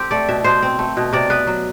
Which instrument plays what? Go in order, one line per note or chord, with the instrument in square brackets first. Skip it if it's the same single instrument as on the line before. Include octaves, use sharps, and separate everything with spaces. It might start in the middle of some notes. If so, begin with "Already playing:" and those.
Already playing: [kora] C4 G4 A4
A3 D5
B2 E5
B2 C5
C4
A3
B2
C3 D5
B3 B4
F#3